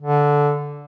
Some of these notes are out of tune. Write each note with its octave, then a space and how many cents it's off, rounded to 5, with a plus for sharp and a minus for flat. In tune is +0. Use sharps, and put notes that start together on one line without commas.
D3 -10